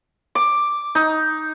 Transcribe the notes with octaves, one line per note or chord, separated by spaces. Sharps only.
D6
D#4